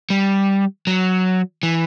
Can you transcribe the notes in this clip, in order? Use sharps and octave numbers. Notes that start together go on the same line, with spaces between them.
G3
F#3
E3